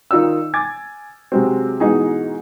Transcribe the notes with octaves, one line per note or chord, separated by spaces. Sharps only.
D#3 D#4 F4 D5 E6
G#5 D6 G#6 A6
C3 F#3 G#3 C4
G#2 B2 E3 D#4 F#4 G#4